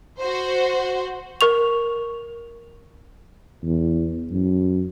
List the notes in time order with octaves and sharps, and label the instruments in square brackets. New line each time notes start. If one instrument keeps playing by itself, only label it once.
[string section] F#4 C5
[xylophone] A#4 C#6 F7
[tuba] E2
F#2